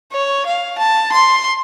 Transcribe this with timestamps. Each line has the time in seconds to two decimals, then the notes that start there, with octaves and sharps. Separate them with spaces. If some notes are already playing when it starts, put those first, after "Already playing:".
0.12 C#5
0.46 F5
0.78 A5
1.12 C6